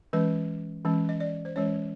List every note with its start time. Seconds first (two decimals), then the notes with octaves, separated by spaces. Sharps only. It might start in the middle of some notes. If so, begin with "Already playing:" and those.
0.13 E3 G#3 C#4 B4
0.85 E3 G#3 C#4
1.09 D#5
1.20 D5
1.45 C5
1.56 E3 G#3 C#4 C#5